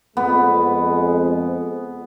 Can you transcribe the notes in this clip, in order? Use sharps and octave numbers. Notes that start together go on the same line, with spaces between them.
F2 G#3 B3